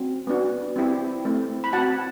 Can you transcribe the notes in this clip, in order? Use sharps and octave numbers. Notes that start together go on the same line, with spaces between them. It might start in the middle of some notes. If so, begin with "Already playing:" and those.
Already playing: C4 F#4
B3 D4 F#4
C4 E4 G4
A3 C4 E4
B5
C4 F#4 F#5 A5